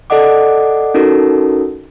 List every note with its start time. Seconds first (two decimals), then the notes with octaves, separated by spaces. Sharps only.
0.10 A4 D5 D#5 F#5 D6
0.94 C#4 D#4 F#4 A4 A#4